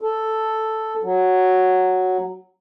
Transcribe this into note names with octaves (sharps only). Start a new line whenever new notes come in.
A4
F#3